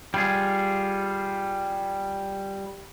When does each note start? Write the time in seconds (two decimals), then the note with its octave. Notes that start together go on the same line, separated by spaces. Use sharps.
0.14 G3 F4 G#4